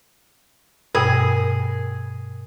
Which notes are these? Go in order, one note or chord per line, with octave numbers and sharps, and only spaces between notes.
G2 B2 G#4 A#4 G5